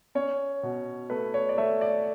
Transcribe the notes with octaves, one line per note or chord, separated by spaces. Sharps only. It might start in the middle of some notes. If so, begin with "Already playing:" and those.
C#4 C#5
B2
A3 B4
C#5
D5
A3 E5
D5